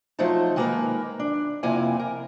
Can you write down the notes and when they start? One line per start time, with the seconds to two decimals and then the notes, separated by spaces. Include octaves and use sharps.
0.19 F3 F#3 A3 D#4 C5 A5
0.56 D#3 G#3 A#3 B3 A#4 B4
1.19 D4
1.63 F2 C3 A#3 E4 G#5
1.99 A#4